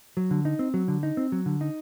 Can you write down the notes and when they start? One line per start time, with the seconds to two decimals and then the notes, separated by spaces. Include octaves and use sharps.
0.17 F#3
0.31 D3
0.45 D#4
0.59 C4
0.74 F#3
0.88 D3
1.03 D#4
1.17 C4
1.32 F#3
1.46 D3
1.61 D#4